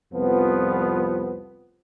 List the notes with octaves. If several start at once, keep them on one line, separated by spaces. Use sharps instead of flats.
C2 F2 F3 B3